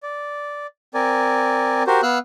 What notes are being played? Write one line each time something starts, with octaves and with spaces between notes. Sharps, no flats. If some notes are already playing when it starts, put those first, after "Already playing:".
D5
C4 A#4 D5 G#5
F#4 G4 A#4 C5
B3 F5 E6 F#6